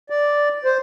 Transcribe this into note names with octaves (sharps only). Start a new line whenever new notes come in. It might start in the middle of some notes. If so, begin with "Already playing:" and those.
D5
C5